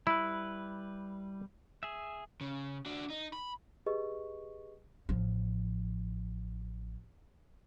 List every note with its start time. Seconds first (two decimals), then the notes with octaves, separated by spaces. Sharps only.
0.07 G3 E4 B4
1.83 G#4 E5
2.41 C#3
2.86 D4 F#4
3.10 D#4
3.33 B5
3.86 G4 G#4 B4 D#5 C#6
5.09 A1 F3